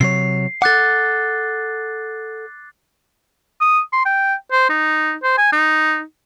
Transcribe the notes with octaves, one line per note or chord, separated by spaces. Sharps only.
C3 F#3 C#5 C7
A4 F#5 D6 F#6 A6
D#6
C6
G5
C5
D#4
C5
G#5
D#4